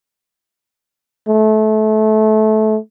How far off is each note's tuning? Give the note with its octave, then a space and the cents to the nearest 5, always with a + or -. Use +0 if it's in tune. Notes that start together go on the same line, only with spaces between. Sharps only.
A3 -25